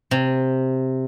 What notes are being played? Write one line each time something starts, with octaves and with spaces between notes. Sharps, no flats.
C3